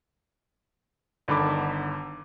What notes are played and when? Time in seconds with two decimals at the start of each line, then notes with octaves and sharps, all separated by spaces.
1.28 G1 D3 D#3 B5 D6